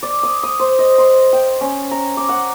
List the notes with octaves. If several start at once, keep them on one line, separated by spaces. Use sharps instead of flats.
D5
D#6
D#6
C5
D#5
C6
G5
C#4
A#5
D6
F#5